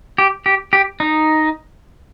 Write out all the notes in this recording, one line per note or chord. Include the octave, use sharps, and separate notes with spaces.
G4
G4
G4
D#4